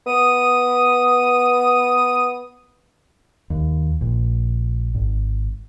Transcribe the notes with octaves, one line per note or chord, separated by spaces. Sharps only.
B3 D#6
D#2
A#1
G#1